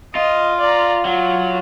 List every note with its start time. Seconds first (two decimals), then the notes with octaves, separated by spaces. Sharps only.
0.15 F4 D#5
0.61 D5 A#5
1.05 F#3 F4